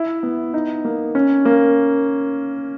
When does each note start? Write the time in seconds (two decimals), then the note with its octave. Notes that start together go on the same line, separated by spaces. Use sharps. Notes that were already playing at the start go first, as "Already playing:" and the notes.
Already playing: E4
0.23 B3
0.54 D#4
0.85 A#3
1.15 C#4
1.45 A#3